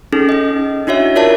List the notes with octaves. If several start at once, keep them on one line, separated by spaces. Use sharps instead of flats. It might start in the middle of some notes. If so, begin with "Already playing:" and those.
C#4 D#4 G#4 A4
C#4 D#5
D4 E4 F#4 C#5 E5
F4 A#4 C#5 D5 E5 A5